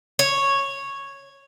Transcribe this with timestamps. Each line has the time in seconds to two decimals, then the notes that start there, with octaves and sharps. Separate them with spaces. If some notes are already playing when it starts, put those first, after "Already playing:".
0.19 C#5